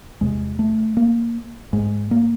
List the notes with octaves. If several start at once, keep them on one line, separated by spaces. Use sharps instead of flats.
E2 C3 G#3
A3
A#3
G#2 G#3
A#3